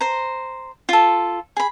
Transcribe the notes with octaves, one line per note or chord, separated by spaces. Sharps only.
C5 A#5
F4 A4
G#4 B5